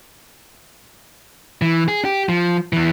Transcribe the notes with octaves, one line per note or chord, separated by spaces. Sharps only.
E3
G#4
G4
F3
E2 E3